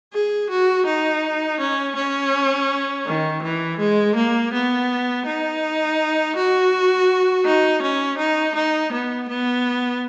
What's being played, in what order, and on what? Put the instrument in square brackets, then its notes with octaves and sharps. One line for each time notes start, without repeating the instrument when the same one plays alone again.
[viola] G#4
F#4
D#4
C#4
C#4
D#3
E3
G#3
A#3
B3
D#4
F#4
D#4
C#4
D#4
D#4
B3
B3